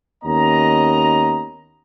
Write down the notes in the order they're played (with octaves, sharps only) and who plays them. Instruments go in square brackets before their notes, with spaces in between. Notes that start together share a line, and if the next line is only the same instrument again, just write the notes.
[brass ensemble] D#2 B3 C#4 D#5 A#5